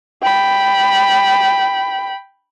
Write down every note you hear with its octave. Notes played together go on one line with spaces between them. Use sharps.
G5 B5